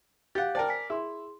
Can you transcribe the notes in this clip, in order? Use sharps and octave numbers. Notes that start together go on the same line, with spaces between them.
G4 F5 F#5 A6
A#4 C5 D5 G5 A5
G#5 B6
E4 G#4 C6